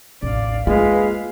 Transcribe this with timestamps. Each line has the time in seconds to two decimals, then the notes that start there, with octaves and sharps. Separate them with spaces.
0.23 A1 D#2 D5 F5
0.67 G#3 A#3 F4 B4 F5